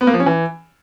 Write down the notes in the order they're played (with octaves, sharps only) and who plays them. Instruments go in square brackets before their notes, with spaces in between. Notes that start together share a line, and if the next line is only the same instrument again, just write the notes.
[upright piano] B3
A#3
F3
C#4
E3